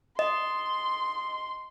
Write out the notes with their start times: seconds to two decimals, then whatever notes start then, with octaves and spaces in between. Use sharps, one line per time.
0.19 D#5 C6